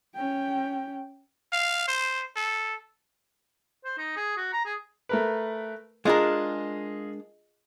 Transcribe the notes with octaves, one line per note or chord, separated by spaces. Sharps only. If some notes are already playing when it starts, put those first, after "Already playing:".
C#4 G5
F5
C5
A4
C5
D#4
G#4
F#4
A#5
G#4
A3 A#4 B4
G#3 D4 F4 G#4 A#4 D#5